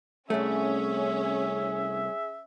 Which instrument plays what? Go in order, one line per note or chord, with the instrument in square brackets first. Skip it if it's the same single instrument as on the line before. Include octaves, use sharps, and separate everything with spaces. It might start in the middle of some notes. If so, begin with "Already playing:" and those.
[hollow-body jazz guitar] C2 A3 [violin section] C#4 [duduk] G#4 [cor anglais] E5